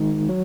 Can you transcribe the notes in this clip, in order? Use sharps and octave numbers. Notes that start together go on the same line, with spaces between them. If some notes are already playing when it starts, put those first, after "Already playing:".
Already playing: D#3 G#3 D#4
F#3